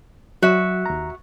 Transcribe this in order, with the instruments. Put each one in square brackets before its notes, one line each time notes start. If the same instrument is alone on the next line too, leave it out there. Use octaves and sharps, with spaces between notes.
[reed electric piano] F#3 [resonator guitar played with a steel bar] F#4 E5
[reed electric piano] D#2 A#5